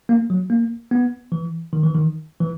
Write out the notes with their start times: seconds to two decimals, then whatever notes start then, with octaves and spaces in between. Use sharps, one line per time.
0.09 A#3
0.30 F#3
0.50 A#3
0.91 B3
1.32 E3
1.73 D#3
1.84 E3
1.94 D#3
2.40 E3